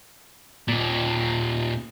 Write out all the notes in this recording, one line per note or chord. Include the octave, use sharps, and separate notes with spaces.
D#2 A#2